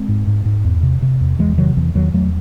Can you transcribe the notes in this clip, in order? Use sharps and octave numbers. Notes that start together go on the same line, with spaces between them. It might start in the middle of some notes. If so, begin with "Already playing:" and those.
Already playing: G#3 C4
G#2
G#2
G#2
E2
C3
C3
E2
E2 E3 G#3
C3 D#3 F#3
E2 E3
E2 D#3 F#3
E2 F#3 A3